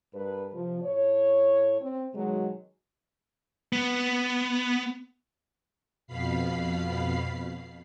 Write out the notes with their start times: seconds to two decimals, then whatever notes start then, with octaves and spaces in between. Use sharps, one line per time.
0.14 G2 A#4 B4
0.53 C3 F3
0.83 A2 C#5
1.81 C4
2.14 B2 D#3 F#3 G#3
3.73 B3
6.07 F2 B2 F5 B5 C7